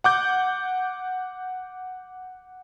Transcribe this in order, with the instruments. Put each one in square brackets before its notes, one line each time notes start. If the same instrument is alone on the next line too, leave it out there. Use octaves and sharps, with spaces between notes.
[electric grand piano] F#5 D6 G6